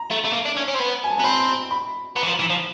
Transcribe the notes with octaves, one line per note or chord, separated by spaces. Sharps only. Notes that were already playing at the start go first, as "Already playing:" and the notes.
Already playing: A#5
A3
A3
A#3
D4
C#4
C#4
C4
B3
G#5
A5
B3 A#5
C4 B5
B5
B3 A#5
E3
F3
E3
F3